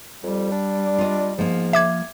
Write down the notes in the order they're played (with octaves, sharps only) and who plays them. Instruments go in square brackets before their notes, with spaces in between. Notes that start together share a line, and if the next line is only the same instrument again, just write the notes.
[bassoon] F2 [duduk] G3
[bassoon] D4
[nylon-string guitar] F4 D#5
[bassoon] G#2 [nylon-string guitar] F3 A#3
[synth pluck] E5 D6 G#6